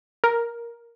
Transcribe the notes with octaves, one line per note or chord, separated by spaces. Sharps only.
A#4